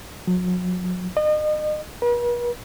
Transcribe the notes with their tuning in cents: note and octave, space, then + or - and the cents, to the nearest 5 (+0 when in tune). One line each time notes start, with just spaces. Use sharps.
F#3 -35
D#5 -35
B4 -45